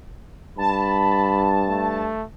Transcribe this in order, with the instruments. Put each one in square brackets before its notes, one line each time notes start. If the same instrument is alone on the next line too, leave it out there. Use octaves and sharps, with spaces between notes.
[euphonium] G2 [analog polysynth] A5 [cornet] B5
[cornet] A3